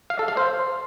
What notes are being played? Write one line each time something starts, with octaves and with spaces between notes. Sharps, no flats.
F5
A4
F5
C5